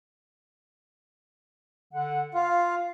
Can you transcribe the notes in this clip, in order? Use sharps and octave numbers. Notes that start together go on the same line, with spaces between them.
D3 F#5
F4 F5